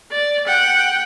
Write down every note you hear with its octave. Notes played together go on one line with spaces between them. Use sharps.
D5
F#5 G5